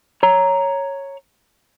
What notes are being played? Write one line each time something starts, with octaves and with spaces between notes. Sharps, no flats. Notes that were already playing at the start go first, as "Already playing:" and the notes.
C#5 A#5